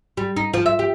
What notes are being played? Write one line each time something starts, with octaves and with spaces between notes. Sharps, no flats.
G3
D#4
F3
E5
G4